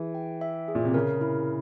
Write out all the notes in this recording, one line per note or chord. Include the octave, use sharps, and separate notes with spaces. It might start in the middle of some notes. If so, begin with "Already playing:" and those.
Already playing: E3 G#4
G5
E5
G#4
A#2
C3
C#3 A#4
E4